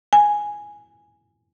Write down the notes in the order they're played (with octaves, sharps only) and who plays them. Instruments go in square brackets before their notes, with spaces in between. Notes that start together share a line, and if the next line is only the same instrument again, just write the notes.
[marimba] G#5